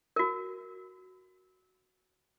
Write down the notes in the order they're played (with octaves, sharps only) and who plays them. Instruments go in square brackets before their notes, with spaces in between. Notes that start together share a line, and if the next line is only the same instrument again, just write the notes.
[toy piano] F#4 A#4